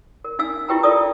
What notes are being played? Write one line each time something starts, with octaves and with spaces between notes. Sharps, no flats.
A#4
D4 D#4 F5 E6
E4 F4 G4 B4 G5 A#5
F4 A4 A#4 D5 D#6